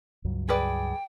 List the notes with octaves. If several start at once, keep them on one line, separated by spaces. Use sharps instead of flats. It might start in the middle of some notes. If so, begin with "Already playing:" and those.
C#2 G2 F#3
G#4 B4 D5 G5